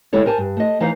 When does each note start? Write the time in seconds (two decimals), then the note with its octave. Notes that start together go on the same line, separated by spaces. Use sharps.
0.13 D2 G#3 E4 A4 C#5
0.26 A#4 C5 G#5 A5
0.38 G2
0.57 A3 D#5
0.80 E3 D#4 C5 F5